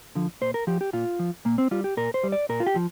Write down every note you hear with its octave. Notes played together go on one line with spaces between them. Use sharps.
D3 F3
A#2 C5
A#4
F3 G4
G4
A#2 F4
F3
A#2 A#3
C4
G3 F4
G4
A#2 A#4
C5
G3
D5
A#2 A#4
F4
G4
F3